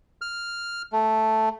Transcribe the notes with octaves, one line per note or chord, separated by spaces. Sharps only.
F6
A3